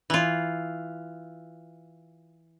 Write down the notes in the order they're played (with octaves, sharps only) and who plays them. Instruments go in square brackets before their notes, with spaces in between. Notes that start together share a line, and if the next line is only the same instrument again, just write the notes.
[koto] E3 F4